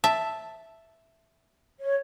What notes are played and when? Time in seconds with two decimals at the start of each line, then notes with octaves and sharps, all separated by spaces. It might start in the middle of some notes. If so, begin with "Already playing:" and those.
0.04 E5 A5
1.80 C#5